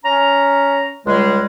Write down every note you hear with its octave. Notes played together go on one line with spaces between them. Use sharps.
C#4 A#5
C#2 G3 G#3